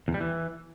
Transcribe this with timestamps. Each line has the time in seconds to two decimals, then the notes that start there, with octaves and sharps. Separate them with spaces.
0.08 E2
0.14 G3
0.21 E3